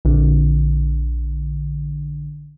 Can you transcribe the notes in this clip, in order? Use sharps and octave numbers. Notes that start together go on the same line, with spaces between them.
A#1 D3